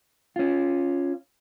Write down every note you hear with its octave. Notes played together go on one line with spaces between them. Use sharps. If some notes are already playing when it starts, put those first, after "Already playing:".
C#4 F4